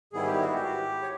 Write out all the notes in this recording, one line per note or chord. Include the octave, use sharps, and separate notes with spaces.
G#2 D#3 G3 B3 E4 G#4
G4
F#4
G4
C#5